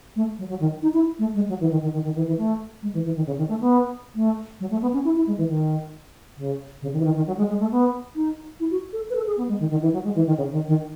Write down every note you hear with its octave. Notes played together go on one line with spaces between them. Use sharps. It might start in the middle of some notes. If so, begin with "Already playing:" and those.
A3
F#3
F#3
D#3
D#4
E4
A3
G#3
F#3
E3
D#3
D#3
D#3
D#3
E3
E3
A3
G#3
E3
E3
D#3
C#3
D#3
A3
B3
A3
F#3
A3
B3
C#4
E4
E4
G#3
E3
D#3
C#3
C#3
D#3
E3
D#3
D#3
F#3
G#3
G#3
A3
B3
D#4
E4
F#4
A4
B4
A4
G#4
B3
G#3
D#3
D#3
E3
F#3
G#3
E3
D#3
C#3
D#3
D#3